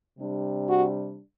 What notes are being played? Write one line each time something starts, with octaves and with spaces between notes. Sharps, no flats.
C3 G3 D4
F#4